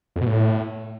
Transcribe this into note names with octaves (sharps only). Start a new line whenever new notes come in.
F2
B2
A2